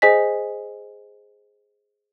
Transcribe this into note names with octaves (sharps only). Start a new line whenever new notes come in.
G#4 C5 D#5 G#5 B6